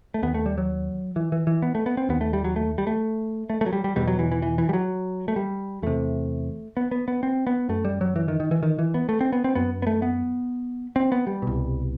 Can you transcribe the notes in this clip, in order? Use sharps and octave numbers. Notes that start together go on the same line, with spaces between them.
A3
D#2 B3
A3
G3
F#3
E3
E3
E3
B3
A3
B3
C4
D#2 B3
A3
G3
F#3
A3
G3
A3
A3
A3
F#3
G3
G3
E2 B2 G3
F#3
E3
E3
E3
E3
G3
F#3
A3
G3
E2 C3 A3
B3
B3
B3
C4
B3
F#2 A3
G3
F#3
E3
D#3
D#3
E3
D#3
E3
B3
A3
C4
B3
C4
F#2 B3
B3
A3
B3
C4
B3
G3
C2 B2